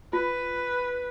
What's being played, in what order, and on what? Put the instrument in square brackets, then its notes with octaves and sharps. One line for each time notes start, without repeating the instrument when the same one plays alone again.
[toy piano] F4 [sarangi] B4